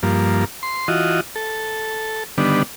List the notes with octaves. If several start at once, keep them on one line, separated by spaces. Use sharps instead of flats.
G2 F3 A#3
C6
E3 F4 F#4 D#5
A4
D3 D#3 G3 B3 D4